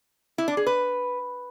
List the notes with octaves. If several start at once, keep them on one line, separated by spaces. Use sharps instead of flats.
E4
D4
G#4
B4